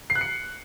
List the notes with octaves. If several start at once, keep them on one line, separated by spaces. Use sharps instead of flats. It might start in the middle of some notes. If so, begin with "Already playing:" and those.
C7
F#6
C#7